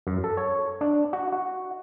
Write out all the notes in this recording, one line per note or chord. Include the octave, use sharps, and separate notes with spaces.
F#2
A4
C#5
D4
F#4
F#4